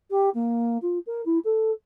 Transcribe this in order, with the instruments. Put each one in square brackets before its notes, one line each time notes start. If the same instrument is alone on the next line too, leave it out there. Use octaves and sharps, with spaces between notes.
[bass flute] G4
A#3
F4
A#4
E4
A4